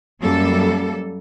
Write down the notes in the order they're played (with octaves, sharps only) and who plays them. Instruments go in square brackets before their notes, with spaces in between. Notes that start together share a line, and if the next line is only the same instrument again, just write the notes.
[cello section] F#2 G3 A#3 A4